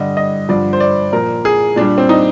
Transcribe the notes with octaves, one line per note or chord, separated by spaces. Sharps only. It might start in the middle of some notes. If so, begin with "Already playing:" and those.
Already playing: G2 D3 G3 D#5
D#5
G2 D3 F3 D5
C5
D5
A#2 F3 A#4
G#4
A#2 G3 D4
C4
D#4